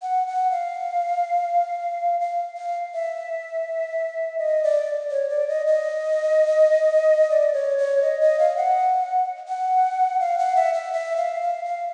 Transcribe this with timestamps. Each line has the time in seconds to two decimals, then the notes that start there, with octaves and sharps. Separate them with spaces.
0.02 F#5
0.27 F#5
0.51 F5
2.20 F5
2.57 F5
2.94 E5
4.38 D#5
4.64 D5
5.11 C#5
5.29 D5
5.48 D#5
5.67 D#5
7.30 D5
7.53 C#5
7.78 C#5
8.02 D#5
8.21 D#5
8.39 F5
8.57 F#5
9.48 F#5
10.20 F5
10.38 F#5
10.56 E5
10.74 E5
10.93 E5
11.17 F5
11.42 F5
11.65 F5